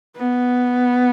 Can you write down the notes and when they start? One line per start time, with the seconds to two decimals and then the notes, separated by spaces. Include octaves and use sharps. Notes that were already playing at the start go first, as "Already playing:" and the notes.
0.17 B3